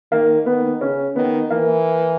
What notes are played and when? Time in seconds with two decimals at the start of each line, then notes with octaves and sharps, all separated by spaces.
0.12 D#3 A#3
0.46 D#3 B3
0.81 C#3 C#4
1.16 D#3 B3
1.51 E3 A#3